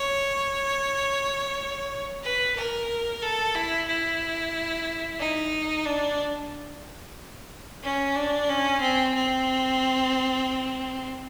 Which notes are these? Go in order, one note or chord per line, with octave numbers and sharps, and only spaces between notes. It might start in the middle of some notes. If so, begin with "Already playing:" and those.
Already playing: C#5
B4
A#4
A4
E4
E4
D#4
D4
C#4
D4
C#4
C4
C4